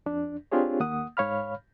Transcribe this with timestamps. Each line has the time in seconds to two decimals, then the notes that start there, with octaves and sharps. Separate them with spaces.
0.06 F2 D4
0.52 C4 D4 F4 G4 G#4 C#5
0.80 D#2 A#3 F#5 D#6
1.17 G#2 C#5 F5 B5 F6